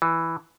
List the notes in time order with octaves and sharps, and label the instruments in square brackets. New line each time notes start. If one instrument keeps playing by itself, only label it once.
[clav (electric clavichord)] E3